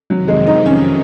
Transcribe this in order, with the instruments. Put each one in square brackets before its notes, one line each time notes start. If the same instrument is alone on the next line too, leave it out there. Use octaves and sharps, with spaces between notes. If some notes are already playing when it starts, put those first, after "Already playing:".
[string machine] F2 C3 D#3 [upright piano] F#3
[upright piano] G#3
D#4
C#4